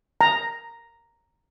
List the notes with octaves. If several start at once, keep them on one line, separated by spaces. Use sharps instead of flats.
A#5